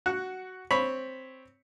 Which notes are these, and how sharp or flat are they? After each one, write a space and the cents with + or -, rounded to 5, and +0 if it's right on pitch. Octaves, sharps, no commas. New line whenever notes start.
F#4 +10 F#5 +0
C4 +0 C#5 +0 B5 +0